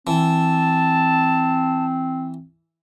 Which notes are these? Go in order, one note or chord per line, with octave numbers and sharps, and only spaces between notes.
E3 C4 A5